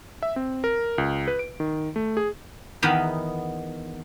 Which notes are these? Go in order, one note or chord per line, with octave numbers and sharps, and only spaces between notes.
E5
C4
A#4
C#2
B4
D7
D#3
A3
G#4
E2 D#3 B3 D#4 G5 B5